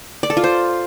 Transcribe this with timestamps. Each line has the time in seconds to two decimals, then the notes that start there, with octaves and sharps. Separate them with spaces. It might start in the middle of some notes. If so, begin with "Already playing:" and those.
0.23 D5
0.30 A4
0.37 F4
0.44 C5